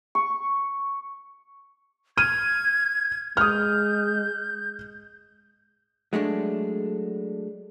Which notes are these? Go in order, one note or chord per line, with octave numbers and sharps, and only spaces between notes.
C#6
F6 G#6 D#7
G#3 D#6 F6 G6
F#3 G#3 A3 D4